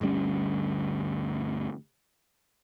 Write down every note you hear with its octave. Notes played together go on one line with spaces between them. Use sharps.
G1 D2 G3 C#4